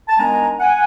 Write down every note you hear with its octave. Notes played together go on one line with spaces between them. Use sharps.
A5
D#3 G#3 B3 D4 G#5 A#5
F#5 G#5